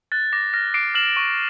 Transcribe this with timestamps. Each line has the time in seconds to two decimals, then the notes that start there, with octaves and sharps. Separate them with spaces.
0.12 F#6 A6
0.33 D6 A#6
0.54 F6 A#6
0.74 D6 C7 D7
0.95 F6 E7 F#7
1.17 C#6